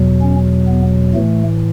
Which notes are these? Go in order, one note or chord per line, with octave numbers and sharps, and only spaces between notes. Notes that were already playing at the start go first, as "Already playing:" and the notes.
Already playing: E2 B2 F#3
C#4
B3
A2 E3 A3